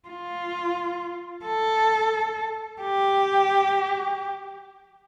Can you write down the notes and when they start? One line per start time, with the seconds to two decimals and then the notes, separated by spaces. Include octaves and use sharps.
0.09 F4
1.45 A4
2.82 G4